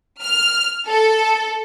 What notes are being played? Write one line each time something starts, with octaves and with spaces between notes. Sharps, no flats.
F6
A4